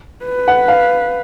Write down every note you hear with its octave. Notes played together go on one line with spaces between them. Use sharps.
B4
F#5
F5